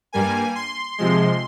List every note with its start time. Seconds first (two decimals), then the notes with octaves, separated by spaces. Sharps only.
0.13 G2 G3 A#3 G#5
0.55 C6
0.98 C3 F3 G#3 C6